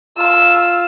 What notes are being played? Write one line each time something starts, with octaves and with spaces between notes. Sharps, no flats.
F4 E6